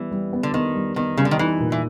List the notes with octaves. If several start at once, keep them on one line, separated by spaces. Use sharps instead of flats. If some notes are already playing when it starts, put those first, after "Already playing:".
Already playing: E3 G3 B3
G3
B3
D3
D#3 B3
G3
D#3 B3
C#3 G3
D3
D#3
E3 D#4
A#2
E3